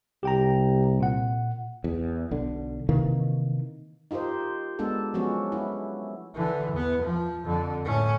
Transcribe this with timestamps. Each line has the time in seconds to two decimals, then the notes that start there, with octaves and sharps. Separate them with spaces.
0.23 C2 G4 G5 A#5
1.00 A#2 F#5
1.84 E2
2.31 B1 D3
2.89 C3 D#3 E3 A#3
4.11 D#4 F4 G4 A#4 C5
4.79 G#3 B3 D4 A4
5.14 F3 F#3 G#3 B3 C#4 F#4
5.52 E4
6.34 D3 E3
6.72 E2 B3
7.03 F3
7.44 F2 D3
7.85 A2 C#4